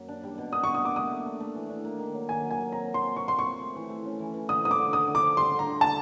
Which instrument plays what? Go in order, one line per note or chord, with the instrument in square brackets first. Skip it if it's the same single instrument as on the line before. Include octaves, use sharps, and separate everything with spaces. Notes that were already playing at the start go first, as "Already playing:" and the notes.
Already playing: [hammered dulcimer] F#2 A#3
D4
G3
B2
[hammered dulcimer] D4 [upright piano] D#6
[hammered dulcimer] B2 [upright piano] C#6
[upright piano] D#6
[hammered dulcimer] A#3 [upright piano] D6
[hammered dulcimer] A3 [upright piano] D#6
[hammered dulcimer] A3
D4
A3
E3
D4
A#3
D#3
F#3
[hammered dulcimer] D#3 [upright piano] G#5
[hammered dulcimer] F#3
[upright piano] G#5
[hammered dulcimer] F#3
[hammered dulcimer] C4 [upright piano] A#5
[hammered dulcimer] F3
[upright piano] C6
[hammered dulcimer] C4
[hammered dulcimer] F3 [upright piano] C#6
[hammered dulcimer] C4 [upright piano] C6
[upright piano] C#6
[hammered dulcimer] C4
A3
E3
A3
C#4
E3
E3
[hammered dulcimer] D3 [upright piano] D#6
[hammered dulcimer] F3 [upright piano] D#6
[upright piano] D6
[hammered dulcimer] D3
[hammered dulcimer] D3 [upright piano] D#6
[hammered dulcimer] D3
[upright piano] D6
[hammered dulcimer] F3
[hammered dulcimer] G3 [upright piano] C6
[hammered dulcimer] D3
[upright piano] A#5
[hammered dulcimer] D3
[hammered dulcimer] D3 [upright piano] A5